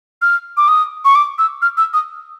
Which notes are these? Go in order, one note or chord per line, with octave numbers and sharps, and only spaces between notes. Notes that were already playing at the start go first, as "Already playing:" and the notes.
F6
D6
D#6
C#6
D6
E6
F6
E6
D#6